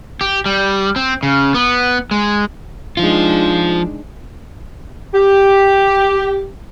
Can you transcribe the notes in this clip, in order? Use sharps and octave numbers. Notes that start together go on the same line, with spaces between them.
G4
G3
C4
C#3
B3
G#3
F3 G#3 D4 D#4 F4
G4